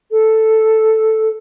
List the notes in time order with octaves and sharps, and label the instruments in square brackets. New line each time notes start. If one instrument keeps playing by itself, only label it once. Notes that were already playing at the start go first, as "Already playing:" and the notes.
[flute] A4